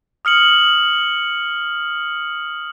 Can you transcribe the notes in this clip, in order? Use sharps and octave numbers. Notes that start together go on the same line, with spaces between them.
D#6 F6 C#7 F#7